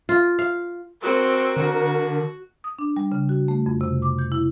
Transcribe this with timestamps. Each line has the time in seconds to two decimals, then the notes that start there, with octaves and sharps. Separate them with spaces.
0.09 F4
0.39 F5
1.02 C4 F#4 A#4
1.57 D3 F#4
2.64 D#6
2.79 D4
2.97 G3
3.12 C#3
3.29 F#4
3.48 A3
3.66 F2
3.81 C3
4.02 D6
4.19 G6
4.32 E4